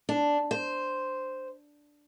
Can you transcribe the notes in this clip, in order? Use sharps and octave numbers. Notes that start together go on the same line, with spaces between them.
D4
C5